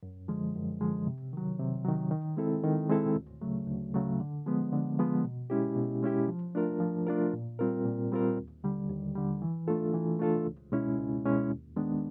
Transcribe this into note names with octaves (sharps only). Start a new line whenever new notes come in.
F#2
D3 F3 G#3
F#2
D3 F3 G#3
C3
D#3 F#3
C3
D#3 F#3
D#3
G#3 C4 E4 A4
D#3
G#3 C4 E4 A4
D2
C#3 F#3 A3
D2
C#3 F#3 A3
D3
F3 G#3 B3
D3
F3 G#3 B3
B2
G#3 C#4 E4 G4
B2
G#3 C#4 E4 G4
F3
A3 D4 F4 A#4
F3
A3 D4 F4 A#4
A#2
G3 C4 F4 A#4
A#2
G3 C4 F4 A#4
D#2
D3 G3
D#2
D3 G3
E3
A3 D4 F4 A4
E3
A3 D4 F4 A4
C#2
B2 G#3 C#4 E4
C#2
B2 G#3 C#4 E4
D#2
D#3 G#3 B3 D4